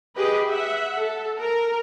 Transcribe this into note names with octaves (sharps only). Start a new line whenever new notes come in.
G4 G#4 B4 D#5
E5 F#5
A4
A#4